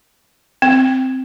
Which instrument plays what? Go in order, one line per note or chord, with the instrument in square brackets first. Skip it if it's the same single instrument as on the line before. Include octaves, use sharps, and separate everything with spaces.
[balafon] C4